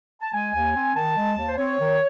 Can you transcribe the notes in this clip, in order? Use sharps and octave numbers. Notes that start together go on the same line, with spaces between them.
A5
G#3 G#5
D#2
C4
D#3 A5
G#3
D#2
C5
C4 C#5
D#3